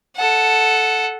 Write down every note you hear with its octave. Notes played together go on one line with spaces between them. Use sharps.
A4 F#5